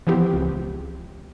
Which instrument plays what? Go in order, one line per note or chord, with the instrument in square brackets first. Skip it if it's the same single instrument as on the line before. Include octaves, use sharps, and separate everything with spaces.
[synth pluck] E3 F3 B3 C4 G4
C#2